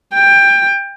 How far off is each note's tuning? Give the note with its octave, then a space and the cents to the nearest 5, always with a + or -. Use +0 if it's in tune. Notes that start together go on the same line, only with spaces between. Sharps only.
G5 +20